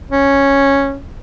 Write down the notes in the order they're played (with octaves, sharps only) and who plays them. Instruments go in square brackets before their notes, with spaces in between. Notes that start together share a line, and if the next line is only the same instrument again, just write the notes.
[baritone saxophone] C#4